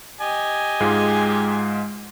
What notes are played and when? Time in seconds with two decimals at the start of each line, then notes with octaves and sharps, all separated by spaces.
0.21 G4 D#5 G#5
0.80 G#2 G#3 F4